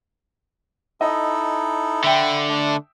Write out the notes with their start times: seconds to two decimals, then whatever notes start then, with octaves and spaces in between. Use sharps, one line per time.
1.01 D#4 E4 A4 D#5
2.04 D3 E5 G5 B5
2.49 A3 D4